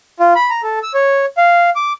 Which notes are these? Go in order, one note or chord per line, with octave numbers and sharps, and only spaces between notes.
F4
B5
A#5
A4
E6
C#5
F5
D6